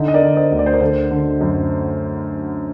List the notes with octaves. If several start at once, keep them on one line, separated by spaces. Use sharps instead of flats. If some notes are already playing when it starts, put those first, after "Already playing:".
Already playing: D3 D#4
D#5
A#4 D5
D3
C5 D#5
D2
D5
C5
A#4 D5
D3 A4 C5
D3
F#2